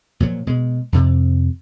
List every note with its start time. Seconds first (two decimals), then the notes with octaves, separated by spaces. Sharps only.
0.20 A#2 F3 F#3
0.47 B2 G#3
0.92 F2 C3